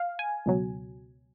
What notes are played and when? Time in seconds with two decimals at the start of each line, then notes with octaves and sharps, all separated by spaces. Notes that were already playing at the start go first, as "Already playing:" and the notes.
Already playing: F5
0.19 G#5
0.46 C#2 B2 F#3